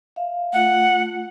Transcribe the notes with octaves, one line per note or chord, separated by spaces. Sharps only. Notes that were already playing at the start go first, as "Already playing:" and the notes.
E5 F5
A3 F4 F#5